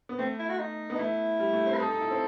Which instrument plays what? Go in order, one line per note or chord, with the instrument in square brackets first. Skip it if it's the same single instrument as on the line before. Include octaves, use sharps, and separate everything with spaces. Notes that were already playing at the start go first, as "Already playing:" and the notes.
[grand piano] B3
[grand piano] A3 [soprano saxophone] C4
[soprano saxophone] E4
F#4
D#4
[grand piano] B3
[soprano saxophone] D#4
[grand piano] A3 [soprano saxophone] E4
[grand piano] G3
A3
C4
[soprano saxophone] B4
[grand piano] D#4 [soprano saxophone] A4
[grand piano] D#4
E4
C4